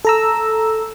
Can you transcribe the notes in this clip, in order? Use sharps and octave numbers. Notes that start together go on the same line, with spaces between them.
A4 A#5 E6